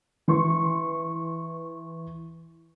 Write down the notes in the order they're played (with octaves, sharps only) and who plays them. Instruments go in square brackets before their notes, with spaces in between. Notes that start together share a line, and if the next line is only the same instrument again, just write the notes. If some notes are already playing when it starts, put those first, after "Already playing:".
[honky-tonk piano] E3 C6 C#6